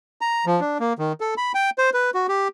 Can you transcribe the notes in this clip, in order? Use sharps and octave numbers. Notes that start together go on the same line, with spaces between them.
A#5
F3
D4
A#3
D#3
A4
B5
G5
C5
B4
F#4
G4